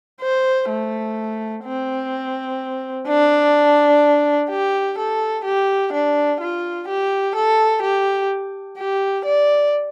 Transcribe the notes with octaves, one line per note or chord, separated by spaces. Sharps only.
C5
A3
C4
D4
G4
A4
G4
D4
F4
G4
A4
G4
G4
D5